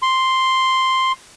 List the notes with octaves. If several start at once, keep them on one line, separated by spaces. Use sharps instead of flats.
C6